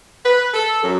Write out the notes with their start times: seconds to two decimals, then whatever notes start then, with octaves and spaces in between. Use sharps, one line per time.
0.24 B4
0.54 A4
0.83 F#2